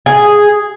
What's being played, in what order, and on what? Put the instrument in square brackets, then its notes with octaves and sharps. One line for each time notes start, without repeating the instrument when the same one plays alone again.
[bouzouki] G#4